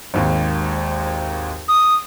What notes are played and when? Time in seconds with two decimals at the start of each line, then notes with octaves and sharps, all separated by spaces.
0.14 G#1 D#2 G#2
1.69 D#6